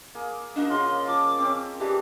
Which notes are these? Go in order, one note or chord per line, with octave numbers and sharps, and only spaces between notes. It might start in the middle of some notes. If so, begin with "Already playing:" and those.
A#3 G#4
A#3 D4 F#4 D#5
C#3 F4 C6
F3 D6
C4 C#4 G4
E3 D4 G4 G#4